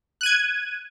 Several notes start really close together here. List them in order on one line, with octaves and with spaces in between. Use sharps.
F#6 D#7 G#6